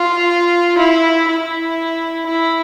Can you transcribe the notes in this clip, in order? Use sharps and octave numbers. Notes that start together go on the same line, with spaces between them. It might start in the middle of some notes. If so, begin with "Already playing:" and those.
Already playing: F4
E4
E4
E4